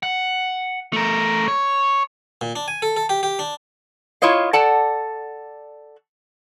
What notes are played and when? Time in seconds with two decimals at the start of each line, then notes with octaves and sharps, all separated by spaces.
0.03 F#5
0.93 A3 A#4
1.48 C#5
2.41 A#2
2.56 D4
2.68 G#5
2.82 A4
2.97 A4
3.09 G4
3.23 G4
3.39 D4
4.22 E4 F4 C#5 D#5 F5
4.53 A4 D5 F#5 A5